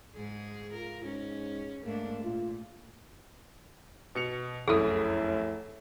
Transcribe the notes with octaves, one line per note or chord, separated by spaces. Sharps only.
G#2 G#4
F4 A#4
G#2 C#4
G#2 A3 A#3 D4
A#2 F4
B2 C#7 F7
F1 C2 F#2 A2 G#4 A4